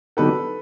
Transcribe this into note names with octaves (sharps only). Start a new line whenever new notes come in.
D3 F#3 B3 D#4 G4 A4 B4